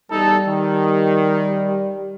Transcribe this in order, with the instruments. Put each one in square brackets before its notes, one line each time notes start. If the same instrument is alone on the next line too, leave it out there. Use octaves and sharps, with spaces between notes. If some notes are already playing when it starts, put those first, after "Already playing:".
[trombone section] E2 D#4 A4 [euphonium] G3
[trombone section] D#3